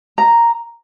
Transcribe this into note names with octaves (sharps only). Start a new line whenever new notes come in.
A#5